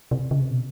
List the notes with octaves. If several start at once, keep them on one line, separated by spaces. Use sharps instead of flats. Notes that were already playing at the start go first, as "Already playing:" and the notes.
C3
C#3
C3
B2